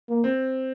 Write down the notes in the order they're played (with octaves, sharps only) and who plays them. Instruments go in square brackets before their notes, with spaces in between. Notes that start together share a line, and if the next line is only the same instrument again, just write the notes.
[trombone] A#3
[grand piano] C4